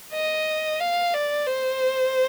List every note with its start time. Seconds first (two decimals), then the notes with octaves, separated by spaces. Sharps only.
0.13 D#5
0.80 F5
1.14 D5
1.47 C5